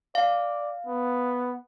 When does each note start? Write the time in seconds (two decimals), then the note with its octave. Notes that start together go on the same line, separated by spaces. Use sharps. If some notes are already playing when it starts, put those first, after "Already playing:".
0.15 D5 F5
0.87 B3